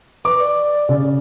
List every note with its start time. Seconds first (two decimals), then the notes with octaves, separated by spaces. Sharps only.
0.25 B4 D6
0.40 D5
0.89 C#3